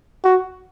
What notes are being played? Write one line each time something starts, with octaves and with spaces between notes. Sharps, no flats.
F#4